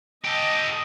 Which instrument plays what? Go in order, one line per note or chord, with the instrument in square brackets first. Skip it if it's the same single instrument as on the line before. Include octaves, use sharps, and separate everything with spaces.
[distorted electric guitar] G4 A4 [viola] D#5